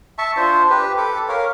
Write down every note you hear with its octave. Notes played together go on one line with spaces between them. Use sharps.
E5 A5 C#6
D4 F4 C5
G4 B4
A4 D6
A#4 C#5 F5